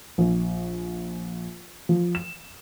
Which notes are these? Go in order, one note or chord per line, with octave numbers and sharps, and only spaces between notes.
A#1
F3
E7